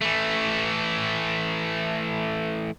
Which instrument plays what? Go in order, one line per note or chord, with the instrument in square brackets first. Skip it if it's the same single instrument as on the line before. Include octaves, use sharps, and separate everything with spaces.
[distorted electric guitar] E3 A3